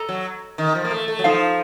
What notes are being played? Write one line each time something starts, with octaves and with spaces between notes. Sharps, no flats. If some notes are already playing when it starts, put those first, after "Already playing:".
Already playing: A4 D#5 A#5
F#3
D#3
F3
A#3
A3
A3
F#3
F3 D#4 A4 C5 F5